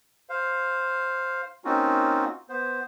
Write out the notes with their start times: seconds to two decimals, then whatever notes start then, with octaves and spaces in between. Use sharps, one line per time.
0.29 C5 F5
1.65 A#3 C4 C#4 D#4 F4 F#4
2.49 B3 C5